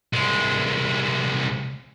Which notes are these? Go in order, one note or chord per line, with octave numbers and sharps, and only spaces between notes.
C2 G#3